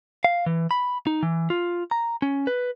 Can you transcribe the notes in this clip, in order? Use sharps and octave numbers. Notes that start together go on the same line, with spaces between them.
F5
E3
B5
D#4
E3
F4
A#5
C#4
B4